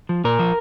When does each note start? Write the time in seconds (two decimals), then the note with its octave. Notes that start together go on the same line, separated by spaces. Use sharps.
0.09 F3
0.24 A#2 A#4
0.39 F3